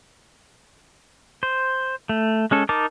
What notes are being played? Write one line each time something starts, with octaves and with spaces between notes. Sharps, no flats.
C5
A3
G#3 C#4 A4
D#4 A#4 A5 D6